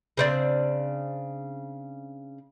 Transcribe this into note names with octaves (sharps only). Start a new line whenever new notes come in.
C#3 C4 D4